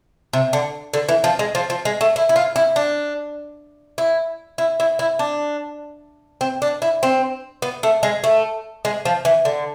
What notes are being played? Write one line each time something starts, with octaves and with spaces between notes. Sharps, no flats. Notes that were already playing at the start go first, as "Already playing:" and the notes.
C3
D3
D3
E3
F3
G#3
F3
F3
G#3
A3
E4
E4
F4
E4
D4
E4
E4
E4
E4
D4
C4
D4
E4
C4
B3
A3
G#3
A3
G#3
F3
E3
D3